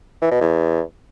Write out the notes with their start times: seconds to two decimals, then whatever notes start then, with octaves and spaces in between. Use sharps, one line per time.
0.22 E3
0.32 B2
0.41 E2